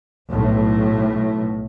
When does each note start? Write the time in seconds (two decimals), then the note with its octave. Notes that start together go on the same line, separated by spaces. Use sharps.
0.31 B1 A2